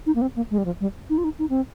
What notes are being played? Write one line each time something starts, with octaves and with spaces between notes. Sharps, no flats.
D#4
A#3
C4
A#3
G#3
G3
F3
G3
D#4
F4
D#4
D#4
C4